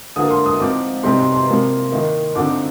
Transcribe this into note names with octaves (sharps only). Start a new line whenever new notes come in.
D3 F3 A#3 D#6
C6
D#6
F3 C4 D#4 D6
C3 G3 C4 D#4 C6
C6
C6
C3 F3 A#3
D#3 A#3 D#4
D3 F3 C4 D#4 D6